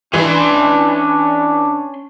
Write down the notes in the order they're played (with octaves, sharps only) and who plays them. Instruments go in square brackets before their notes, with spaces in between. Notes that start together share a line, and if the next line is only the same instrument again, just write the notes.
[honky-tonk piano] E3 [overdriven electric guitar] C#4 C6 [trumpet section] D4